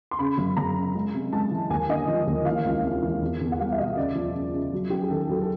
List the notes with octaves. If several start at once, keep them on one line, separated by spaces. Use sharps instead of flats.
C6
C#3 B5
F#2
F#2 A#5
C#3
G#3
C3
G#3 A5
E3
D#2 G#5
D3 D#5
F3
D#2
E3 F5
C#2
C3
E3
E2
E2
F#5
G3 F5
E5
B2 D#5
C#3 D5
F3
C#3
C#3
F#3
F#3 G4
G#4
D#3 A4
F#3 A4
A4